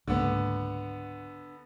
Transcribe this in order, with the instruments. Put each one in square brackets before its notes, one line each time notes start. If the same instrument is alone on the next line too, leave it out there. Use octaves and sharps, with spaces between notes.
[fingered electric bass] C#2 G#2 A#3 [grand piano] D3 B3